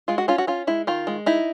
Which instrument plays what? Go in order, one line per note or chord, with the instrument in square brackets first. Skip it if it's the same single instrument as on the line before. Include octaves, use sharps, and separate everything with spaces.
[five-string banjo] G#3 F4
F#4
C#4 F4
F#4
C#4 F4
G#3 E4
D#3 F4
G#3
D#4 E4